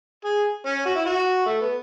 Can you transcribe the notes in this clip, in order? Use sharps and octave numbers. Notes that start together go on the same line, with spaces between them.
G#4
C#4
F#4
E4
F#4
A3
B3